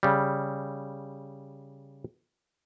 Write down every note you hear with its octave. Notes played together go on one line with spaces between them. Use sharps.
C#3 G3